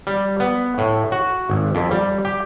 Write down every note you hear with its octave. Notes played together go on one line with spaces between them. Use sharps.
G3
B3
A2
F#4
G#1
F2
G3
G4